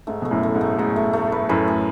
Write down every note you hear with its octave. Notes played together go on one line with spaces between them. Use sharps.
G#2 A3
B2 A3
F#2 A2
A3
G#2
A3
G#2 A3
A3
A3
B4
F#2 A2 B4
G#4